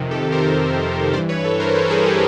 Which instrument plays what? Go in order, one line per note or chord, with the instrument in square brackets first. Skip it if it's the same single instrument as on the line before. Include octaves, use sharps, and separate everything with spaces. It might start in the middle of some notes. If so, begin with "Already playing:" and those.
Already playing: [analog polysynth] F2 C3 D#3
G4 A4
A#4 C5
G2 E3 C5 D5
B4 C#5
A4 B4
A#4 C5
C5
A4 B4
A4
G#4 A#4
G4 A4